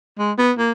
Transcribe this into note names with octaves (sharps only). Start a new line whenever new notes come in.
G#3
B3
A#3